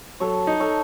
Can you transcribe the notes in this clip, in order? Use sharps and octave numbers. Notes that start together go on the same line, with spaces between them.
F#3 A4 C#5
D#4
A4 C#5